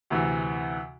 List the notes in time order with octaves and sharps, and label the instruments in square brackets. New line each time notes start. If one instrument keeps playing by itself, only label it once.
[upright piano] D2 C3 E3